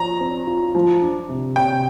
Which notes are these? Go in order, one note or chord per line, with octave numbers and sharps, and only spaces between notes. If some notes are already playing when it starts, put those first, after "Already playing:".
Already playing: F3 A#5
C4
F4
F3
D4
C3
C3 G5